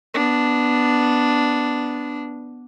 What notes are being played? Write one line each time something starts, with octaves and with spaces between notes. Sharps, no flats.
B3 D4